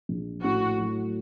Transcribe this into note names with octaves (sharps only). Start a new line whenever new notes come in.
A#1
A2 F#4
F#3